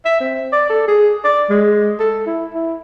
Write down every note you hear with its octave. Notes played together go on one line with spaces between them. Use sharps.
E5
C4
D5
A4
G#4
D5
G#3
A4
E4
E4